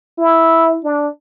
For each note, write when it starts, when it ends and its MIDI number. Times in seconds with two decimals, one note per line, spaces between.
0.18 0.78 64
0.84 1.08 62